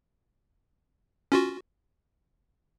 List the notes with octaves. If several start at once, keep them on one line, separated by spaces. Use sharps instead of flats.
C#4 F4 F#4